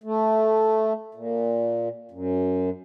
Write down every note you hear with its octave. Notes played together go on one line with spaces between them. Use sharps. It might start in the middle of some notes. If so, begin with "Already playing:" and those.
A3
A#2
F#2